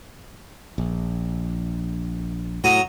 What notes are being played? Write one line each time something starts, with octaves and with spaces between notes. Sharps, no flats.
A#1
A2 F#3 A#5 D#6